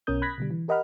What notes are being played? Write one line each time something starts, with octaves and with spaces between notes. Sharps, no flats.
B1 B2 C#4 A#4 D#6 G6
B5 F#6 G#6 A#6 B6
B2 D3 G3
E3
G4 A#4 D#5 F#5 B5 F6